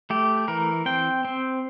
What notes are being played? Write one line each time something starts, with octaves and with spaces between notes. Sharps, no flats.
A3 G4
E3 A#4
C4 G5
C4